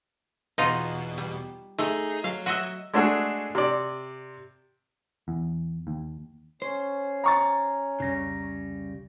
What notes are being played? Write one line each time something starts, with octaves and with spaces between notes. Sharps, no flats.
E2 B2 D#4 F4 D#5
G3
A3 D#4 G#4
F#3 F5
F#4 D#5 E5
G#3 A3 D4 F#4 G#4 A4
C3 D5
E2
D#2
C#4 C5 C#5
A#5 C#6 A6
C2 F2 C#3 G3 A#6